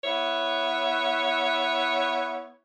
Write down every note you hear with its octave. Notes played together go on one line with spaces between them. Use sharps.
B3 E4 C#5